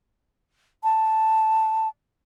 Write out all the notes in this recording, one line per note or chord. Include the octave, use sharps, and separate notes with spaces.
A5